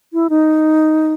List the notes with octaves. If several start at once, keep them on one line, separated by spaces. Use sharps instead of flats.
E4
D#4